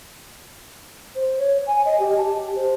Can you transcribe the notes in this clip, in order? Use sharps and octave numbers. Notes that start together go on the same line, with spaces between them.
C5
C#5
G#5
D#5
G4
A5
G4
C5